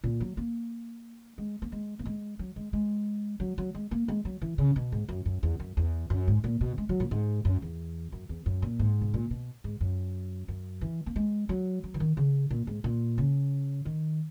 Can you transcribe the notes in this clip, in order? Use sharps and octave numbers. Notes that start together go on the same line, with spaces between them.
A#2
F#3
A#3
G#3
A#3
G#3
A#3
G#3
F#3
G#3
G#3
F#3
F#3
G#3
A#3
G#3
F#3
E3
C#3
B2
G#2
F#2
F#2
E2
F#2
E2
F#2
G#2
A#2
B2
G#3
F#3
A#2
G#2
F#2
E2
F#2
E2
F#2
A#2
G#2
B2
A#2
B2
G#2
F#2
F#2
E3
A#3
G#3
F#3
F#3
E3
D#3
C#3
A#2
G#2
A#2
C#3
D#3